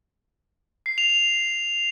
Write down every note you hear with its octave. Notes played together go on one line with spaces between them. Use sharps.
C7
F7
F7